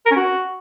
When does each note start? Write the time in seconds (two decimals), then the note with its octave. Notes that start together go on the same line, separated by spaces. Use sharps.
0.06 A#4
0.11 C#4
0.16 F#4